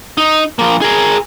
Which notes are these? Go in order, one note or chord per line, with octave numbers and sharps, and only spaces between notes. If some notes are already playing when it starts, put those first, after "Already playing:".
D#4
F3 A#3
G#4 A#4